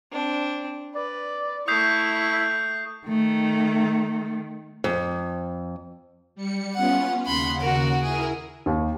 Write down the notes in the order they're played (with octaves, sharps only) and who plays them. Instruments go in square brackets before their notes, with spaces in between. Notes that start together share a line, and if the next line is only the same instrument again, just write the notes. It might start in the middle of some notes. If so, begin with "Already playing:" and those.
[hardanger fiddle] C4 D4
[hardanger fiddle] B4 [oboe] D5
[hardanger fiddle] A3 C#6 [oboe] E4 [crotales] D#6 G6 C7
[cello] D#3 A3
[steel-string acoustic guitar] F2
[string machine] G3 C#7
[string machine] B3 C#4 F4 [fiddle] F#5
[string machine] D#2 C#3 F#5 [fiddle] B5 C6
[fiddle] F#4 A#4
[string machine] E4 A#4 [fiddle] G#4
[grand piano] D#2